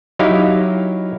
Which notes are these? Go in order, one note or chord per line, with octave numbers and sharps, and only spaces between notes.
F#3 D#4 E4 G4 F5